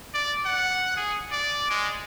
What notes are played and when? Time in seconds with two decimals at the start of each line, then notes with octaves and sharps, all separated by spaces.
0.14 D5
0.45 F#5
0.97 G#4
1.32 D5
1.70 G#3